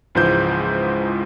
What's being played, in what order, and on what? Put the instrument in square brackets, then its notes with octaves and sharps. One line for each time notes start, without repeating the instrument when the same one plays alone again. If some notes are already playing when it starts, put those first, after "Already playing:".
[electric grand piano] C#2 G#2 E3 F3 C5 G6